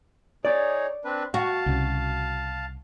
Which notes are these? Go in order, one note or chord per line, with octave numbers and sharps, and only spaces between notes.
D#4 G#4 C#5 D5
C4 D4 B4
F#4 F5 A5
C2 C#3